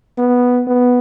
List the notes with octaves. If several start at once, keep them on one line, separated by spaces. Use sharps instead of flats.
B3
B3